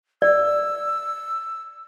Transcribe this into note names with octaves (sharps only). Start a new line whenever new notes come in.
D5 E6